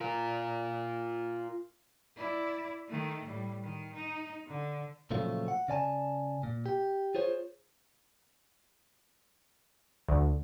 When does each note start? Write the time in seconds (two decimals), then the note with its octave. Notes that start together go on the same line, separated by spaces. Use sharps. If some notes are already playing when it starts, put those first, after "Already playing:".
0.01 F4 A#4
2.16 E4 D5
2.88 D#3 A3
3.25 A2 G3
3.63 D#3
3.95 D#4
4.47 D3
5.11 A#2 C#3 F3 F#3 A3 F4
5.48 F#5
5.68 C#3 D5 G#5 A5
6.43 A#2
6.66 G4
7.15 F4 G#4 C5 C#5
10.08 D2